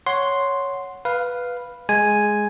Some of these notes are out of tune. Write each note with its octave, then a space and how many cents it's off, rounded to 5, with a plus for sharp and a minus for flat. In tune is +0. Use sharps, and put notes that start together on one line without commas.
C#5 +0 F#5 -5 C6 +0
B4 +0 F5 +0
G#3 +5 G#5 +0